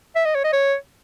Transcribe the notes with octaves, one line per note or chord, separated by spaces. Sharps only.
E5
D#5
C#5
D#5
C#5